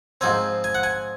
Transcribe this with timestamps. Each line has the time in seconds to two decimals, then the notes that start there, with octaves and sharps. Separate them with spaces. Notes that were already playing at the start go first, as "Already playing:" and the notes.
0.21 G#2 F3 C4 G#5
0.64 G#5
0.75 F#5
0.83 G#5